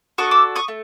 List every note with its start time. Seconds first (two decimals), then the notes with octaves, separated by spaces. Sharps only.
0.18 D4 F#4 A4 C#6 D#6
0.31 D6 E6
0.55 C#6 D#6
0.68 A3